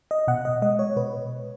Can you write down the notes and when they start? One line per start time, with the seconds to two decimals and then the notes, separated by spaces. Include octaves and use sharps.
0.11 D#5
0.28 B2 F#5
0.45 D#5
0.62 G#3 D#5
0.79 C#5
0.96 B2 B4